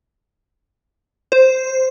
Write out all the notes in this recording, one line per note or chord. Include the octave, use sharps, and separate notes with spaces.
C5